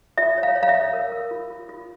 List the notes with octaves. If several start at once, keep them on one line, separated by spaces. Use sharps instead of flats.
F4 E5
C#5
F5
C#5
F5
E5
C#5
A#4
A#4
F4
F4
F4